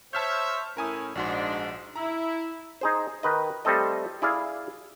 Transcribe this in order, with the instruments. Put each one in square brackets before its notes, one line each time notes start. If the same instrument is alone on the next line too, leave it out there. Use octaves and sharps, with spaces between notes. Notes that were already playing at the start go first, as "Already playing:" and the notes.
[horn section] C5 C#5 E5 [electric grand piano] A5 F6 G6
[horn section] A2 C#4 E4 [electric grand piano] A#4 G#5 D#6
[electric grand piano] A#1 F#4 C6 [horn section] G#2 D4
[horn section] E4 [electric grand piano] A#5
[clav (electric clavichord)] D#4 G#4 C5
D#3 B4 D#5
G3 A3 C4 A4 D#5
E4 G#4 D5 F5